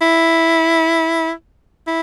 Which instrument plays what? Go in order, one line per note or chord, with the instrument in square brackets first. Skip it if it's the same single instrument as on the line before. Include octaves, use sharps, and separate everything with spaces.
[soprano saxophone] E4
E4